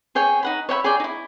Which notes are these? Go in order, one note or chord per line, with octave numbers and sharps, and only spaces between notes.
G#4 C#5 G5 G#5
D#4 F#5 B5
C#5 E5 G5 B5
G#4 C#5 D5 G5
D#4 E4